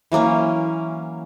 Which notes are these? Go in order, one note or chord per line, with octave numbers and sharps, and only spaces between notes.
E3 F#3 A#3 C#4